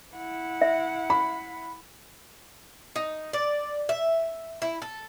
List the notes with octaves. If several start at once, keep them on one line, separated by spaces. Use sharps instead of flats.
E4 F#5
E5
B5
D#4
D5
E5
E4
A4